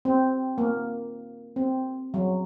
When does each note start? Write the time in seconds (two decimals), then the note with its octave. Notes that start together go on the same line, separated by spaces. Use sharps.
0.05 C4
0.58 A#3
1.56 C4
2.14 F#3